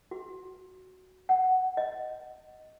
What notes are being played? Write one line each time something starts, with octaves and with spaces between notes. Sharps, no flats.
F#4
F#5
D#5